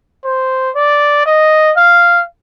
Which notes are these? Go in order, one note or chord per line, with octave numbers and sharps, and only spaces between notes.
C5
D5
D#5
F5